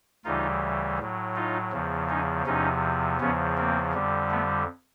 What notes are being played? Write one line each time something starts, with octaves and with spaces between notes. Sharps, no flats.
D2 C#3 E3 G3 D#4 F4
A2 F#3
D#4 F4
E2 C#3 F3
C#4 D#4
E2 C3 F3 C#4 D#4
E2 C#3 F3 B3 C#4
A#3 C4
F2 D3 G3
A3 B3